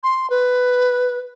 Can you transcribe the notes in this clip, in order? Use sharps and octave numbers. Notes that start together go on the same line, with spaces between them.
C6
B4